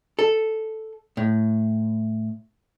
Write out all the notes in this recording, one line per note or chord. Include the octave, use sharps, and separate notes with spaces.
A4
A2